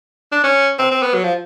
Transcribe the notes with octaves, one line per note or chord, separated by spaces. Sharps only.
D4
C#4
C4
C4
B3
F#3
F3